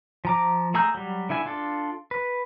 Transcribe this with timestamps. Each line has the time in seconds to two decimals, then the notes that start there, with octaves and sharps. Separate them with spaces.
0.25 F3 A#5 D6
0.74 A3 G#4 A#5 E6 G6
0.95 F#3 G3
1.29 D3 E4 E5 G#5
1.46 D4 F4 A4
2.11 B4